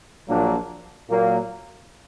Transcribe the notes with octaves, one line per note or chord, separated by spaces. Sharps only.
A#1 A#2 F#3 A#3 D4
A#2 F#3 A#3